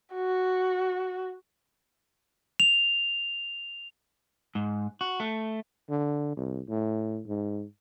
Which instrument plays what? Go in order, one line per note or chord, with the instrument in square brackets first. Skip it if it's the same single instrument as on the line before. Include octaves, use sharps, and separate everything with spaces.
[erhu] F#4
[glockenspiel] F7
[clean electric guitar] G#2
F#4
A3
[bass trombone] D3
C2
A2
G#2